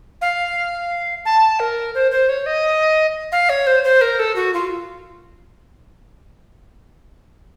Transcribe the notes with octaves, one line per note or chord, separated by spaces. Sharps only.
F5
A5
A#4
C5
C5
C#5
D#5
F5
C#5
C5
C5
A#4
A4
F#4
F4